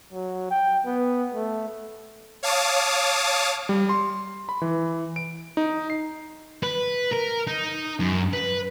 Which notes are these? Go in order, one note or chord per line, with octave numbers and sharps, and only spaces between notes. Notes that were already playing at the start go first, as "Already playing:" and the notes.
F#3
G5
B3
A3
C#5 F5 A5 D6 D#6
G3
C6
B5
E3
D7
D#4
C7
B4
A#4
D#4
F#2
B4